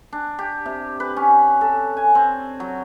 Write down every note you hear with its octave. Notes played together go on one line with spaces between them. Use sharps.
D4
G4
C3
B4
C#4
A4
G#5
C4
F#3